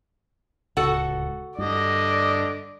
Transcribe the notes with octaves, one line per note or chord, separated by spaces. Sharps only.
D1 C#2 F#4 A4 F#5
G2 D3 D5 D#5